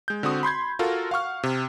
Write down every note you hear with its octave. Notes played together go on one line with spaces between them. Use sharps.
G#3 G6
D3 C4 F#4 D#6
B5 C6 G6 G#6
F4 F#4 A4 A#4
F5 F#5 C#6 F6
C3